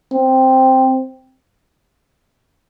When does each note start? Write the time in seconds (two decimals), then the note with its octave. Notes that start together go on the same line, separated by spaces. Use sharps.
0.14 C4